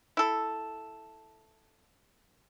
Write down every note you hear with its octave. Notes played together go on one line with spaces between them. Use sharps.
E4 A4